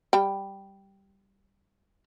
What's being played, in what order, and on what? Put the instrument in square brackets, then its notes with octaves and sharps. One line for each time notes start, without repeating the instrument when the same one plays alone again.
[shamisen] G3 G5